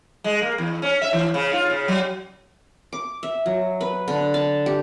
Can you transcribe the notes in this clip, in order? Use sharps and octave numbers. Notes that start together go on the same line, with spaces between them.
G#3
A#3
E2
C#4
E5
E3
C#3
F4
C#3
F#3
D6
E5
F#3
B4
D3
A5
G4